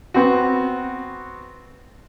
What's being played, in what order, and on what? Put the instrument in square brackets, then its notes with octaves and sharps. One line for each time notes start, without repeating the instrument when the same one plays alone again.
[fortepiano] B3 C4 F#4